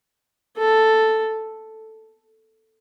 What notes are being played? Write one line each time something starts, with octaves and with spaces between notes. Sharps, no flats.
A4